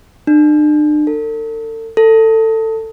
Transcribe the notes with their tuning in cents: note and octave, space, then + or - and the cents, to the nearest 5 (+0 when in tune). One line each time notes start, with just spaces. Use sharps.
D4 +40
A4 +40
A4 +20